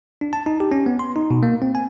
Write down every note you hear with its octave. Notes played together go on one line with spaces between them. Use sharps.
D4
A5
D#4
G4
C#4
B3
C6
D#4
B2
A#3
C4
G#5